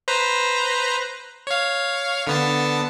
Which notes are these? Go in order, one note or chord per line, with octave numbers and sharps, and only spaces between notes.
B4 C5 A#5
C#5 F5
D3 B3 A5